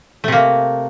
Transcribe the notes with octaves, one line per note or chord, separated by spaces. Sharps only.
C3 A3 A#3